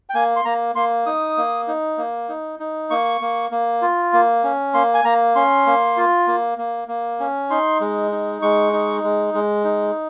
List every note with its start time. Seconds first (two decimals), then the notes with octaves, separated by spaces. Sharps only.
0.09 G5
0.14 A#3 G#5
0.36 C6
0.45 A#3 A#5
0.75 A#3 C6
1.06 D#4 D#6
1.37 A#3
1.68 D#4
1.98 A#3
2.29 D#4
2.59 D#4
2.90 A#3 C#6
3.21 A#3
3.51 A#3
3.82 F4
4.13 A#3
4.44 C#4
4.74 A#3 C6
4.94 G#5
5.05 A#3 A#5
5.35 C#4 C6
5.66 A#3
5.97 F4
6.27 A#3
6.58 A#3
6.88 A#3
7.20 C#4
7.50 D#4 C6
7.80 G#3
8.11 D#4
8.42 G#3 C#6
8.73 D#4
9.03 G#3
9.34 G#3
9.64 D#4